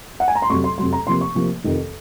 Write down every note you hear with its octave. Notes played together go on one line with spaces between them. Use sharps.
F#5
G#5
A#5
C6
F2 C3 F#3 C#6
C6
F2 C3 F#3 C6
A#5
C3 F3 A#3 C6
C#6
C3 F3 A#3
F2 C3 D#3